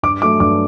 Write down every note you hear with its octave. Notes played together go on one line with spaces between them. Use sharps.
G2 D6
F#3 A3 D6
G2 D6